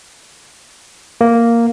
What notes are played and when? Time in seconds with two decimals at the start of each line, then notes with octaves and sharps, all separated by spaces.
1.21 A#3